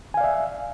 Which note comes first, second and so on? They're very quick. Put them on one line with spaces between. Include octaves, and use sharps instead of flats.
G#5 F5 D5 E5